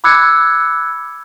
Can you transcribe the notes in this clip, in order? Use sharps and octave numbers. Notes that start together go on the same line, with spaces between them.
B5 D6 E6 F#6 G#6 C#7